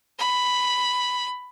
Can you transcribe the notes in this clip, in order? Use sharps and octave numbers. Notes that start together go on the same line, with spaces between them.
B5